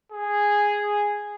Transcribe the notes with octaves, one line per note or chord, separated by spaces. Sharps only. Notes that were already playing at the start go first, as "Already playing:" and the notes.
G#4